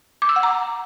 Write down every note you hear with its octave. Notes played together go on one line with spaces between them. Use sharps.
D6
E6
F#5
A#5